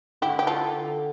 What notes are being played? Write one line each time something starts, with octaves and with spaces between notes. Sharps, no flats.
D3 E4 G4
G4
F4 A4